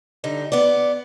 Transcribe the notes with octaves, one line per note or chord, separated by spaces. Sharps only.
G2 D3 D#4
B3 D5